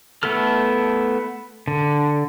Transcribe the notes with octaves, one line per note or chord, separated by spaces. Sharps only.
A3 B3 E4 A4 F6
D3